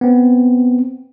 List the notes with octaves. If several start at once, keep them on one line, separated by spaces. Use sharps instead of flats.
B3 C4